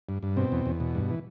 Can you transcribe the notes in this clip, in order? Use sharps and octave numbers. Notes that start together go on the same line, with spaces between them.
G2
G2
B2 C4
E2
E2
B2
G2
E3